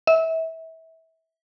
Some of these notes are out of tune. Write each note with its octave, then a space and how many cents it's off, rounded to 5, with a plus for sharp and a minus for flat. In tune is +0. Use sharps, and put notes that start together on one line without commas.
E5 -25